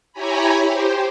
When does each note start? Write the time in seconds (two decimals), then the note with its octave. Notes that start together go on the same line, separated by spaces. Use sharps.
0.13 E4 G4 C#5 G#5 A#5 B5
0.68 G4 C5